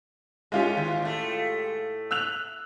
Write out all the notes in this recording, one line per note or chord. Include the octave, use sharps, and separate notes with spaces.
G#2 G#3 C#4 F4 G4
D#2
A2 A3
E6 F#6 F7